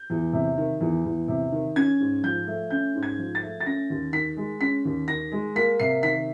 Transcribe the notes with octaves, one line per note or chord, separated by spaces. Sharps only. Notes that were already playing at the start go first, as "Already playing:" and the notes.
Already playing: G6
E2
C3
D#3
E2
E2
C3
D#3
C#4 G#6
G#2
F3 G6
A3
C#4 G6
G#2
G#6
F3
A6
A3
A6
C#4 A#6
D#2
D#3 B6
G#3
C#4 B6
D#2
D#3 A#6
G#3
A#3 B6
C3 C7
D#3 B6